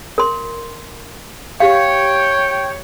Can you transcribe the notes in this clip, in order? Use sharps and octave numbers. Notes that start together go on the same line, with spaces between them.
A#4 C6
G4 C#5 F5 G5